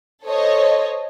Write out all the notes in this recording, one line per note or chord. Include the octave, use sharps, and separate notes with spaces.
A4 C5 C#5 D#5